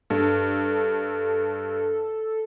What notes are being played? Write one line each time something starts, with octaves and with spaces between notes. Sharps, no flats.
G2 A4